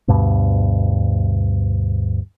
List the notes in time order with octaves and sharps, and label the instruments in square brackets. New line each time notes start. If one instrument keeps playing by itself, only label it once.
[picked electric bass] D2 G2 B2